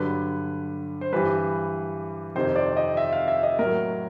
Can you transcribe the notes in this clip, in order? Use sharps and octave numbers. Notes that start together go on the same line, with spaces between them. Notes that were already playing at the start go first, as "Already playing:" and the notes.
Already playing: G2 D3 F#3 B4
C5
G2 E3 G3 B4
F2 C3 D#3 C5
D5
D#5
E5
F5
E5
D#5
A2 F#3 A#4